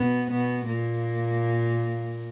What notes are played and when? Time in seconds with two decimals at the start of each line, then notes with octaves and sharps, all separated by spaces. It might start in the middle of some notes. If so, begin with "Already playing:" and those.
Already playing: B2 B3
0.31 B2 B3
0.67 A#2 A#3